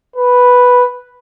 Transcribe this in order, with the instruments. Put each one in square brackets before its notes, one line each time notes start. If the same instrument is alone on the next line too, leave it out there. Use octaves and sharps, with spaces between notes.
[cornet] B4